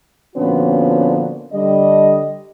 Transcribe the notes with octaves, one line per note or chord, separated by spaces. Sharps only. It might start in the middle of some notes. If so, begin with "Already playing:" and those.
A#2 D3 F3 B3 C#4 F#4
D3 G3 D#5